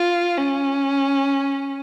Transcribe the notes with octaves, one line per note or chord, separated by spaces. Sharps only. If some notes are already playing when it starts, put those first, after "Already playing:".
Already playing: F4
C#4